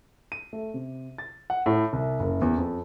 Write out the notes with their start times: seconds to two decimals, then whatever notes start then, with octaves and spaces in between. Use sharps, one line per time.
0.32 D#7
0.53 A3
0.74 C3
1.18 A6
1.50 F#5
1.66 A2
1.93 C2
2.20 F#1
2.42 E2
2.58 F2